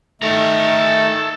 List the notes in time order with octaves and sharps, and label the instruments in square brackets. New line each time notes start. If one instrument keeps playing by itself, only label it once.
[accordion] D#3 A3 [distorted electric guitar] A4 A#5